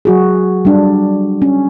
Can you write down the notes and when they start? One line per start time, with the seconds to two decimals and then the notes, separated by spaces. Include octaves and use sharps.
0.05 F#3 F#4 G#4
0.65 G3 D4
1.42 C#4